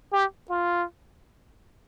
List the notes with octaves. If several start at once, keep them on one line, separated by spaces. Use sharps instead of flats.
G4
F4